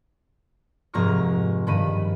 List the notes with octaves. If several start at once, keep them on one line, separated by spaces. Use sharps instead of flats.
F1 G#2 F#4 A#5 C#6 F6
G2 D#3 B5 D#7